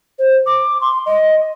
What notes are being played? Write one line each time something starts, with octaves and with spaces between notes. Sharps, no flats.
C5
D6
C6
D#5